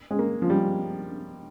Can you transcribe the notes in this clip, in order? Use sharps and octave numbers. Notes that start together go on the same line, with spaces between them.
G#3
A#3
F3
G3